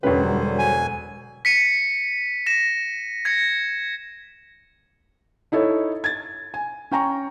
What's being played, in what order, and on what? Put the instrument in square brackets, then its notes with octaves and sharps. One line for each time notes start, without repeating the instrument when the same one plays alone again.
[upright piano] E1 B4 [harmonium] D3 F#3 C5 [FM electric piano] G#3 C#4 G4
[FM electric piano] G3
[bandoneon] G#5
[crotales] B6 C#7 D#7
A#6 E7
G#6 A#6 C#7
[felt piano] D#4 E4 A4 C#5
G#6 A6
G#5
C#4 G5 A#5 C#6